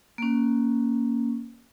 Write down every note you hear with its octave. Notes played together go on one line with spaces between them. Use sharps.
A#3 C#4